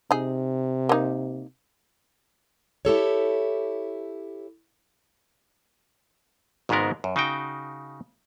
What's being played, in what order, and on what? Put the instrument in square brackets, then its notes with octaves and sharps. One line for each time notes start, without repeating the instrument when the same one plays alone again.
[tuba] C3 [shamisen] D#4 G#4
[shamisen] A#3 D#4
[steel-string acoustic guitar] E4 G4 A4 C#5
[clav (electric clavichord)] G#1 G#2 C#3 G#3 B3 A#4
F#2
C#3 D#4 F#4 G5